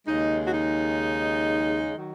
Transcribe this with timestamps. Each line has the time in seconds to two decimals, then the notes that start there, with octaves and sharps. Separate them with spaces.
0.07 D#2 C#3 G#3 D#4
0.47 F#4
0.53 D#4
1.96 D#3 F#3